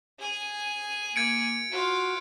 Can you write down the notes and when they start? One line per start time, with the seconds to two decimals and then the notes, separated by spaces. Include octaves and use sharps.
0.20 G#4 G#5
1.16 A#3 G#6 C#7 D7
1.72 F4 F#4 F5